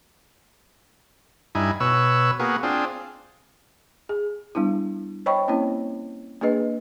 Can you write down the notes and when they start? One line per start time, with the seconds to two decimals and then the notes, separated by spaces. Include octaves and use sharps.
1.55 G2 D#4 E4 G#5
1.80 B2 B4 C#5 E6
2.40 A#3 B3 F#4 G#4
2.63 C4 D4 F4 G#4
4.09 G#4
4.55 G3 B3 D4 E4
5.26 C5 C#5 D#5 G5 B5 C#6
5.48 A#3 C4 C#4 E4 C#5
6.41 A#3 D4 G#4 B4 D#5